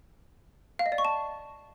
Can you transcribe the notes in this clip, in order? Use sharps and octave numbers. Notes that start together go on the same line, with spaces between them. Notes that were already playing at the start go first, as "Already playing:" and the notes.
F5
D#5
D5
C#6
A5